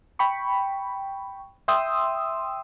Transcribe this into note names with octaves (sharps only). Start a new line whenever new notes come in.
G5 B5 C#6
E5 G5 C6 D#6 E6